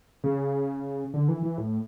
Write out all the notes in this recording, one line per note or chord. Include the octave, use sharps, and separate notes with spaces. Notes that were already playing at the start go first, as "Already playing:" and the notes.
C#3
D3
E3
E3
A2